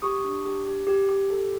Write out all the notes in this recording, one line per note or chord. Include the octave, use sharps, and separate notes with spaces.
G4 C#6 D#6
D4
G4
G4
G4
G4
A4